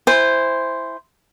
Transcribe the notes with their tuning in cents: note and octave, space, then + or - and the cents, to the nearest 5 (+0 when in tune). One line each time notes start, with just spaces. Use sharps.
E4 +0 C5 -5 G#5 -25